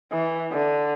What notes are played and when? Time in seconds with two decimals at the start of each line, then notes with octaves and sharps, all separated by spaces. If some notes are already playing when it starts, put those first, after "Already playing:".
0.12 E3
0.52 D3